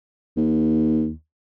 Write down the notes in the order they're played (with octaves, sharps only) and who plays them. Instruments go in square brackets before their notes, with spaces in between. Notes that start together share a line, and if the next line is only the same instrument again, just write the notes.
[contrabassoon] D#2